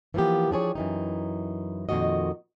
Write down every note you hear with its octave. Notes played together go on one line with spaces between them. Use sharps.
E3 F3 A#3 B3 G4
F3 D4 G#4 C#5
F#2 E3 D#4
F2 A#2 D#3 F#4 D#5